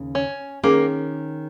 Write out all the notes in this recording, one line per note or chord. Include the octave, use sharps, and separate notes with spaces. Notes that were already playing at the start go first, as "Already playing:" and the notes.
Already playing: D#2 C#3
C#4
D#3 A#3 C#4 G#4